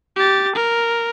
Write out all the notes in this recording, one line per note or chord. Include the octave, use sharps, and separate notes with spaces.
G4 A6
A#4